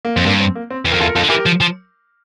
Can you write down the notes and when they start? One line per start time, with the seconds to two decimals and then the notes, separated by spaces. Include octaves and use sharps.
0.05 A#3
0.16 F2 C4
0.26 G2 A#3 D4
0.40 C4
0.55 A#3
0.70 C4
0.85 E2
0.91 F2 A#4
1.00 E2 F4 A4
1.07 A#4
1.15 F2 F4 A4
1.23 D3
1.30 E3 G4 A#4
1.46 F3
1.61 F3